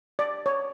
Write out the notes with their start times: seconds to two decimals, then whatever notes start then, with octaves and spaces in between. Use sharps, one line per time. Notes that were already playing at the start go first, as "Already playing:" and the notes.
0.19 D5
0.46 C#5